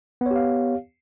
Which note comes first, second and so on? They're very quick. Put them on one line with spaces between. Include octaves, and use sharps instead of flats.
B3 C#5 G4 F5